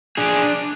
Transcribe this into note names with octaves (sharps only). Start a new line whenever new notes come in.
D4 G#4